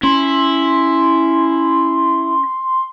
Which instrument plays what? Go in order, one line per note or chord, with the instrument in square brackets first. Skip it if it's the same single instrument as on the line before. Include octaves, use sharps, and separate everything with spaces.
[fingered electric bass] C#4 [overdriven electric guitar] E4 [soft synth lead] C6